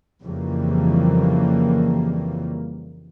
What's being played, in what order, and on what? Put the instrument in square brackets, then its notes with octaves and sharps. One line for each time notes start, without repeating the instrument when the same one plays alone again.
[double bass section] F2 C#3 E3 G3 A#3